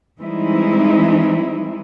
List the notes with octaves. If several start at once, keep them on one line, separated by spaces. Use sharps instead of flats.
E3 G3 G#3 C4 D#4 E4